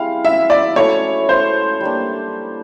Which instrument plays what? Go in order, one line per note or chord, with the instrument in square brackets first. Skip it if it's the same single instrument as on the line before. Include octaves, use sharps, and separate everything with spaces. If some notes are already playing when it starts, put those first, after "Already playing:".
Already playing: [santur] G3 C4 E4 G#4 [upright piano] F5
[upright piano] E5
D5
[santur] F#3 A3 C#4 E4 [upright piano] C#5
[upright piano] C5
[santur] G3 A#3 D4